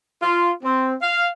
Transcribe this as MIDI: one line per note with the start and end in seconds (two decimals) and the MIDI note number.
0.21 0.51 65
0.63 0.94 60
1.02 1.27 77